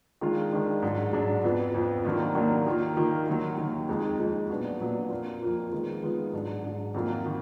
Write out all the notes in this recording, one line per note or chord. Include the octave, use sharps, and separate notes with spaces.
D#3 G#3 D4 F4
D#3 G#3 D4 F4
G#2 F#3 D4
G#2 F#3 D4
F2 F3 B3
F2 F3 B3
D#2 D#3 F#3 A#3 D4
D#2 D#3 F#3 A#3 D4
D#3 A#3 F4
D#3 A#3 F4
D#2 D#3 F#3
D#2 D#3 F#3
F2 F3 G#3 D#4
F2 F3 G#3 D#4
A#2 F#3 B3 D4 F#4
A#2 F#3 B3 D4 F#4
F2 F3 A#3 F4
F2 F3 A#3 F4
D#3 G#3 B3 F4
D#3 G#3 B3 F4
G#2 F#3 D4
G#2 F#3 D4
F2 D#3 F#3 A#3 F4
D#3